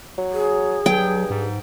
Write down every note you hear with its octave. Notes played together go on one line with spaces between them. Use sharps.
F#3
G#4
G2 F#3 G5
G#2